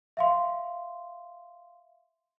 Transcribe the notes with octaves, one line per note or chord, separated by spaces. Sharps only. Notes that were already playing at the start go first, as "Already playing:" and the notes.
E5 F5 C6